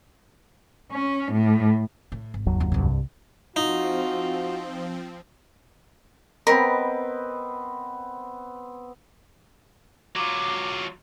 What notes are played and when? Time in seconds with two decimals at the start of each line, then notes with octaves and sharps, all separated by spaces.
0.92 C#4
1.32 A2
2.12 A2
2.34 G#1
2.46 F#1 D#2 F#3
2.60 F#2 F4
2.72 C2 G2
3.56 F3 C4 D#4 F4 F#4
6.47 B3 C4 A#4 D#5 B5
10.16 F#3 F4 D6